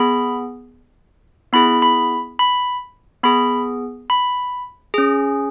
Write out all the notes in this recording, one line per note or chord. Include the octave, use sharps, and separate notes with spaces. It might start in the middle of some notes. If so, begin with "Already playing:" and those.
Already playing: B3 G#4 B5
B3 E4 G#4 B5
B5
B5
B3 G#4 B5
B5
C#4 G#4